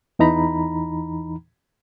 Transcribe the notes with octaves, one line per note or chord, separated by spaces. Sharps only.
E2 E3 D#4 A#5 B5